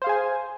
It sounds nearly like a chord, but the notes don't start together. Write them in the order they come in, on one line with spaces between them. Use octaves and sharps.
C5 F5 G#4 G#5